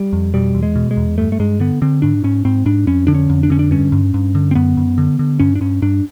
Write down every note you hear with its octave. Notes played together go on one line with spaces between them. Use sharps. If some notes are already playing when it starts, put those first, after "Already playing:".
Already playing: G3
F2
B2 G3
E2
G#3
B2
G#3
E2
G2 A3
A3
G2 G#3
D3 B3
D3 C4
G#2 D4
G#2 C#4
G#2 C4
G#2 D4
F2 C#4
D3 D4
C#4
F2
D4
D3 C#4
D4
G2 C#4
G2
G2
D3
C4
F#2 B3
F#2
D3
D3
G2 C#4
D4
G2 C#4
G2 D4